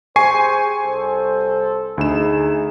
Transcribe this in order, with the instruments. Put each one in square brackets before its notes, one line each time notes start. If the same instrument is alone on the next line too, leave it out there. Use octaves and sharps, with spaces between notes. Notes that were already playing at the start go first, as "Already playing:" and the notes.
[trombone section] G4 G#4 C5 [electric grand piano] G#5 C#6 C7
[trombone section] C2 A4 C5
[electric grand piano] D2 E7 [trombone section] D#4 G#4